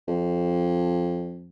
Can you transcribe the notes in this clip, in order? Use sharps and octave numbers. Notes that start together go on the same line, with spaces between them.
F2